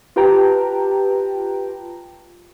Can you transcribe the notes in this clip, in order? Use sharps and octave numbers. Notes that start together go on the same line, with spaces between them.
F4 G4 B4 G5 A5 A#5